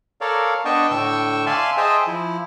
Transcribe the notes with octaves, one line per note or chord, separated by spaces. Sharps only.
A4 A#4 C#5 D5 F5
B3 D4 D#5 G5 A5 C#6
A2 D3 G5 C#6 E6
D5 E5 F5 G#5 A5 C6
G#4 C5 D#5 E5 G5 A5
F3 E4